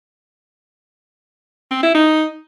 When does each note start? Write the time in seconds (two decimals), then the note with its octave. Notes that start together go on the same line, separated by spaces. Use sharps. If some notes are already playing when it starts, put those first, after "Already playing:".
1.71 C4
1.83 E4
1.95 D#4